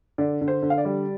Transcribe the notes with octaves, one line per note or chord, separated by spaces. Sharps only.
D3 D5
D3
C5
D3
F5
D5
G3